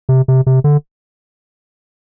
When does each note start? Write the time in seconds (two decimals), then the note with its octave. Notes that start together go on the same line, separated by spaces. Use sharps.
0.09 C3
0.28 C3
0.47 C3
0.64 D3